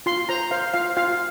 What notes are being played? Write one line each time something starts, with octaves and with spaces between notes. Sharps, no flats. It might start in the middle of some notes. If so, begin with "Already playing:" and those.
F4 C6
C5 A#5
C5 F5
F4 F5
F4 F5